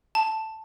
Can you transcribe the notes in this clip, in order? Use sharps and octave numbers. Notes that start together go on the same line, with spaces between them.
A5